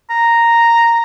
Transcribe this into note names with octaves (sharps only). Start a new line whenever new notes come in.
A#5